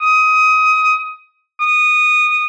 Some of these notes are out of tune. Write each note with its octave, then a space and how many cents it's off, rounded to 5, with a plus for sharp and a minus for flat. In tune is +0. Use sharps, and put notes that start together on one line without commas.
D#6 +20
D#6 -15